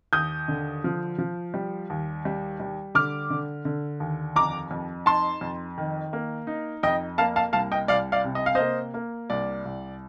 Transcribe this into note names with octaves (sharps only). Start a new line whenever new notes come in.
D#2 D#6 G6
D3
F3
F3
G3
D#2
G3
G3
D3 D6 F6
D3
D3
D#2
F2 A#5 D6
F2
D#4 A5 C6
F2
D#3
A#3
D#4
F2 D#5 G5
A#3 F5 A5
F5 A5
C2 F5 A5
D#5 G5
C2 D5 F5
D5 F5
C3
D#5
F5
A#3 C5 D#5
A#3
C2 D5
C2